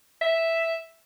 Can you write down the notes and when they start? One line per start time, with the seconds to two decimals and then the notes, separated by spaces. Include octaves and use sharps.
0.22 E5